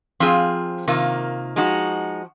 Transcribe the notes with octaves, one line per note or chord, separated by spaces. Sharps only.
F3 C4 F4 G#4
C3 D#3 A#3 F4
F3 G#3 D#4 F#4